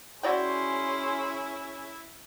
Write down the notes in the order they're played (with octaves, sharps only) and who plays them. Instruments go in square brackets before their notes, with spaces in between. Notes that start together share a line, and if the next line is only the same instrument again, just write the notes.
[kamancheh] C#4 G#4 [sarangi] E4 [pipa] F#4 D5 G5 [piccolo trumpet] C6